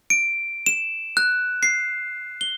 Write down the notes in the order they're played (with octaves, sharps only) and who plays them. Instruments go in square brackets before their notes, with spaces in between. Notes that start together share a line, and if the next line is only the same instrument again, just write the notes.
[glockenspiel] D7
E7
F#6
C7
G7